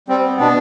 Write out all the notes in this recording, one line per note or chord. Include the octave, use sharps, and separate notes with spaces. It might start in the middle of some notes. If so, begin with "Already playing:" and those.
G3 C4
B3
B2 D4